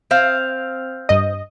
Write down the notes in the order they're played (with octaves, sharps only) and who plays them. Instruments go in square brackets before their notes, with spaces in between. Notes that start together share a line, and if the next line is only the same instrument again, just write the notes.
[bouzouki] C4 F5
[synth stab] G2 D#5